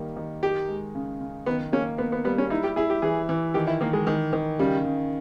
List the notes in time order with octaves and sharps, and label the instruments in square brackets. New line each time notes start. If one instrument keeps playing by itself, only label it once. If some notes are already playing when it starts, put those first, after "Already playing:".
Already playing: [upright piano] D#3 G3 A#3
D#3
[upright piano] D#4 [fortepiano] G4
[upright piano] G#3
C#3
C#3
[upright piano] D#3 [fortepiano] B3
[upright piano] A#3 [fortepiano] C#4
[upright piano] A#3 [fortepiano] B3
[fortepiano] B3
[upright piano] G3 [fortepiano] B3
[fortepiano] C#4
[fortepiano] D#4 [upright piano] E4
[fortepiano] G4
[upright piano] E4 [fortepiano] G#4
[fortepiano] G4
[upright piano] E3 [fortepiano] G#4
[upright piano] E3
[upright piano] D#3 [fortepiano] G4
[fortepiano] E4
[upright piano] D#3 [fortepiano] A#3
[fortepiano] G#3
[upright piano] D#3
D#3
[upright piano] C#3 [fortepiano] G3
[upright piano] C#3